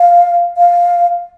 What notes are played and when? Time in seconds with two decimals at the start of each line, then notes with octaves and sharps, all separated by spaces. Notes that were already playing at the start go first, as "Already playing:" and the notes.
Already playing: F5
0.57 F5